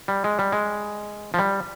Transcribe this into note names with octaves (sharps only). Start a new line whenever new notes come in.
G3
G#3
G3
G#3
F3
G3